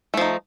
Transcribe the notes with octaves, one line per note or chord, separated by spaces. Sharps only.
F3 A3 D#4